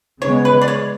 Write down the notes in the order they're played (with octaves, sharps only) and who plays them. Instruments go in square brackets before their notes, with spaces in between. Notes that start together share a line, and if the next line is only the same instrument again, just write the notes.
[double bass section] C#3 G#3 B3 [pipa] C#5
[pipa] B4
D5
C#5